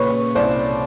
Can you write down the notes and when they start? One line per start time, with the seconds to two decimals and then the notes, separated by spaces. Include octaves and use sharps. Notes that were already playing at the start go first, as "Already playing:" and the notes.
Already playing: A#2 C#3 B4 C#5
0.35 C2 C5 D5